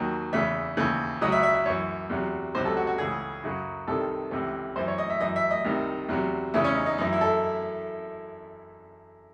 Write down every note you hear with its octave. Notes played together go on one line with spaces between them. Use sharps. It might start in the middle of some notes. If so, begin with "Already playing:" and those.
Already playing: D#2 D#3 F#3
E2 C#3 E3 E5
D#2 C#3 E3
C#2 C#3 F#3 D#5
E5
E5
E5
F#2 E3 C#5
E2 C3 F#3
C#2 C3 F#3 C5
A4
F#4
F#4
C#2 C#3 E3 G#4
F#2 C#3 F#3
C2 C3 D#3 A4
C#2 C3 E3
F#2 E3 C5
C#5
D#5
E5
F#2 E3 D#5
E5
D#5
C2 C3 D#3
E2 C3 F#3
E2 C#3 E3 E4
C#4
D#4
D#4
F#2 E3 D#4
E4
A4